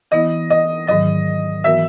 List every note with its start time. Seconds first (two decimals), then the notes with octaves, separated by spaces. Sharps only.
0.11 E3 B3 E4 D#5
0.50 D#5
0.87 G#2 D#3 F#3 D#5
1.64 E3 B3 F#4 A#4 E5